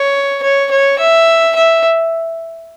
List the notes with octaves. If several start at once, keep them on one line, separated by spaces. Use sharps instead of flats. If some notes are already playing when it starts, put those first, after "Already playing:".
Already playing: C#5
C#5
C#5
E5
E5